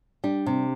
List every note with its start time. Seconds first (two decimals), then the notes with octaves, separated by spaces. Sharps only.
0.24 G3 D4
0.46 C3